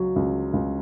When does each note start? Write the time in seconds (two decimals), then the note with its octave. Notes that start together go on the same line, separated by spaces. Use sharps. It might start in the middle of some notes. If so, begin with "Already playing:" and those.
Already playing: C#2 F#3
0.16 C#2
0.53 C#2